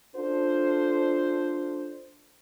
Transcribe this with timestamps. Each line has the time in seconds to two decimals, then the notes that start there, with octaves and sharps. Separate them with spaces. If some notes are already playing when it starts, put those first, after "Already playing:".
0.16 D4 F4 A4 C5